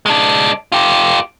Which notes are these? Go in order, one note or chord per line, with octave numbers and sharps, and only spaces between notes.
G#3 D4
F4 G4